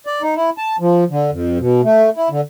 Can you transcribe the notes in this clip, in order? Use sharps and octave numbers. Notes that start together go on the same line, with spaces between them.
D5
D#4
E4
A5
F3
D3
F2
B2
A3
E4
D3